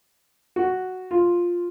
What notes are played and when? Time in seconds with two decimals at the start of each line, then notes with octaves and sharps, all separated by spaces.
0.56 F#4
1.11 F4